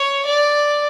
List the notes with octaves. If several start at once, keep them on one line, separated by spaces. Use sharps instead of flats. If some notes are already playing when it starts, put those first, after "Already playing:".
Already playing: C#5
D5